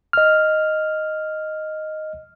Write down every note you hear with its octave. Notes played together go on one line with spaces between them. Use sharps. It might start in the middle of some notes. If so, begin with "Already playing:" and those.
D#5 F6